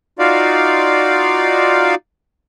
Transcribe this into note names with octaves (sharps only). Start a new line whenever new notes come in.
D#4 F4 F#4 D5 F5